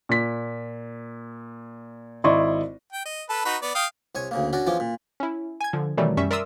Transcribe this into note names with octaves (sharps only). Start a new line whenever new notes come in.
A#2 B6
G#1 E4 D5 D#5 C6 C#6
G5
D#5
A4 B4
D#4 F#4 B4
B3 D5
F5 G5 D#6
C2 C#5 G#5
D2 C#3 A#3
C#4 D4 F#4 A#4
E2 F3 C#4 F4 D6
A#2
C#4 E4
G#5 G#6
D3 F3
B2 D#3 E3 F#3 G3 A3
F#2 G3 C#4 E5 C#6
A#4 D5 E5 C6 D#6 E6